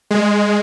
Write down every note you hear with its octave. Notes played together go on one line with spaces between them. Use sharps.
G#3